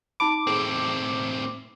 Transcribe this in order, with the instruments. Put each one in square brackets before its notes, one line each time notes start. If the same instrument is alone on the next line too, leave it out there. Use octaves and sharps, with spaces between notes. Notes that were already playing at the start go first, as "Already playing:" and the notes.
[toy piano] D#4 A5 B5 [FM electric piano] D6
[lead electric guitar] A2 C4 [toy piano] G#4 A4